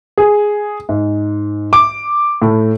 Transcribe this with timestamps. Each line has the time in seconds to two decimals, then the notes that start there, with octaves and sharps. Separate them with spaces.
0.18 G#4
0.89 G#2
1.73 D6
2.42 A2